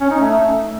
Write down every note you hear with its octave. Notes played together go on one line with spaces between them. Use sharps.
C#4
D#4
A3